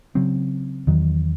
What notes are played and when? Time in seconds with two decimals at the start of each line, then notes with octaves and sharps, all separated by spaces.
0.15 C#3 F#3 C4
0.87 E2 D#3 F#3